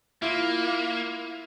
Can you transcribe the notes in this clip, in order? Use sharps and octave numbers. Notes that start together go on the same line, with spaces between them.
A#3 E4 F4